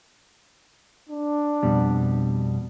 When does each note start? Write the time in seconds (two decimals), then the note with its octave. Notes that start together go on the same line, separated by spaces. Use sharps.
1.09 D4
1.63 F2 B2 G3